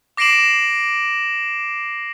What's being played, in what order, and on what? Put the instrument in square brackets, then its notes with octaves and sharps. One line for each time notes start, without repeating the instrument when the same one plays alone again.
[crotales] D6 A#6 C7 D7 E7 F#7